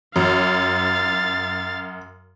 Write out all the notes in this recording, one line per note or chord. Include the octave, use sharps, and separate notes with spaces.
F#2 F5 A6